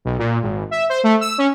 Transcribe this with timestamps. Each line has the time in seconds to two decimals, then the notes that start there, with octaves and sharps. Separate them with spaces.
0.05 B1
0.19 A#2
0.42 G#1
0.71 E5
0.89 C5
1.04 A3
1.21 E6
1.38 C#4